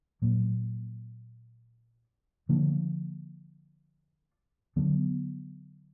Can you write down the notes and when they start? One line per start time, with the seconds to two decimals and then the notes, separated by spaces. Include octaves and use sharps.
0.22 A#2 F#3 A#3
2.49 D3 F3 A#3 D4
4.76 D3 F#3 B3 D4